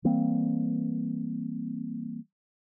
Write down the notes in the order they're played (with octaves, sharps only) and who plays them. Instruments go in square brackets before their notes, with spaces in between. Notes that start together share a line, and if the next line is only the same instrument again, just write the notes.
[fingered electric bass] E3 G3 A#3 C4